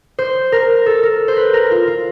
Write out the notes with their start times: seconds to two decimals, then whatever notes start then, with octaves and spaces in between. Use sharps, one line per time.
0.19 C5
0.52 A#4
0.86 A4
1.03 A#4
1.28 C5
1.36 B4
1.54 A#4
1.71 F4
1.87 F4